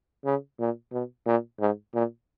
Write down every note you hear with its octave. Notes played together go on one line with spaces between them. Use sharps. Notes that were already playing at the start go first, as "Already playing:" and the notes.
C#3
A#2
B2
A#2
G#2
A#2